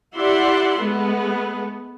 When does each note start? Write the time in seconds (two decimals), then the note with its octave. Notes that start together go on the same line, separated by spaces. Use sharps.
0.15 E4 G4 D5 E5 F#5 C6
0.79 G#3 A3 B3